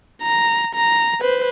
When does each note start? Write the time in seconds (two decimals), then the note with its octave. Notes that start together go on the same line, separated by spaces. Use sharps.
0.22 A#5
0.75 A#5
1.21 B4 C5